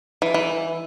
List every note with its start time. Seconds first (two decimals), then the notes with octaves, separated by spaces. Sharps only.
0.22 E3
0.34 E3